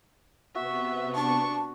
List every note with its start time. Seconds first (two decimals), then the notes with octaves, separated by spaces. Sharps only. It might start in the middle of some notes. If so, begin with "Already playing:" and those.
0.55 C3 B3 F#4 E5
1.15 D4 A5 C#6